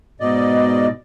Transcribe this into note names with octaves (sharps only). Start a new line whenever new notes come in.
G#2 B2 D5 D#5